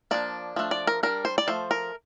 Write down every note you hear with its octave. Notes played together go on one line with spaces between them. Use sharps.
F3 A#3 D4 D5
F3 A3 D4
D5
A#4
G3 D4 A#4
C5
D5
F3 A3 C5
A#4